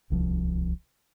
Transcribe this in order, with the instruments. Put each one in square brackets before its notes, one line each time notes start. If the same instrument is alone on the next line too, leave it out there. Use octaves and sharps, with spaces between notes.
[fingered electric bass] D1 C2 F3